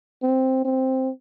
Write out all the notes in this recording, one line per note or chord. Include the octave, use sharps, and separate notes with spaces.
C4
C4